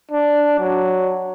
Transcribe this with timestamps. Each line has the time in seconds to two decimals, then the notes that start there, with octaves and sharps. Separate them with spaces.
0.11 D4
0.59 F#3